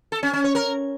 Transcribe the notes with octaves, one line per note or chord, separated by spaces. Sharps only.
A4
C#4
C#4
C#5
A#4